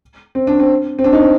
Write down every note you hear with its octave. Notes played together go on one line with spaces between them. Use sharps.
C4
D4
C4
C4
D4
D#4
C4